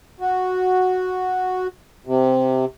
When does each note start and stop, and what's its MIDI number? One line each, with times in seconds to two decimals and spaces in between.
0.20 1.67 66
2.06 2.65 48